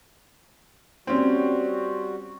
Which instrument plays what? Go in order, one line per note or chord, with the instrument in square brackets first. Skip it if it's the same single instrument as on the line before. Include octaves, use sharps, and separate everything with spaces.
[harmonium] G3 F#4 [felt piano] C4 C#4